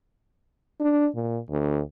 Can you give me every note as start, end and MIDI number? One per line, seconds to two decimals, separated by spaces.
0.80 1.07 62
1.15 1.39 46
1.50 1.80 38